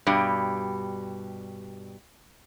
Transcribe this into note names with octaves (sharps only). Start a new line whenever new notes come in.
G2 B2 G3